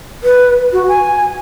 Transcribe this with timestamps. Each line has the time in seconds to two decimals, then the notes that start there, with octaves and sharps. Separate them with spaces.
0.24 B4
0.73 F#4
0.88 G#5